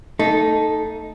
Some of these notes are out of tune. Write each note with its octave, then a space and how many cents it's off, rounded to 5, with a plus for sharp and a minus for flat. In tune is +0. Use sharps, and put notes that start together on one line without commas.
A3 +35 D#4 +0 A4 -5